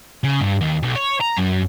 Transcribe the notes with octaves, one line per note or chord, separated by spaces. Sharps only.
C#3
G2
D#2
B1
C#5
A#5
F#2